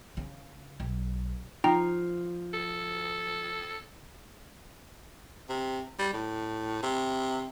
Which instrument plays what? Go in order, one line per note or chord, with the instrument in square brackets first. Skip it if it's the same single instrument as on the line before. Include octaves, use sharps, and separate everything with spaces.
[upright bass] C#3
B1
[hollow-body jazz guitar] F3 [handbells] D#4 G5 A#5
[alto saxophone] A4
[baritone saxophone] C3
G3
A2
C3